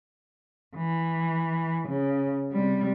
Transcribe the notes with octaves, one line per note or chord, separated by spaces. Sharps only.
E3
C#3
C3 G3